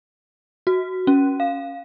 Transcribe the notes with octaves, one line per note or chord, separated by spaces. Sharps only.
F#4
C#4
F5